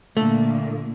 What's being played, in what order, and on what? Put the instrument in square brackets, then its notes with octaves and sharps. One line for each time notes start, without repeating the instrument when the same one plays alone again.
[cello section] A#2 D3 A#3 [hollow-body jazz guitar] A3